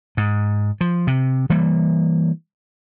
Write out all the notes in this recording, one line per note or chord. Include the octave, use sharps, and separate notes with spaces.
G#2
F3
C3
E3 G3 A#3